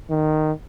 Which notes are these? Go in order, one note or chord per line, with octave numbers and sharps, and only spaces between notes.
D#3